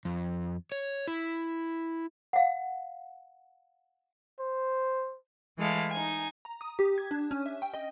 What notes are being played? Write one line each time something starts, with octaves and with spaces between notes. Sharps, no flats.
F2
C#5
E4
F5 F#5
C5
E3 G#3 A3 F5
D#4 G#5
A#5
D#6
G4
G#6
D4
C#4
E5
G5
D#5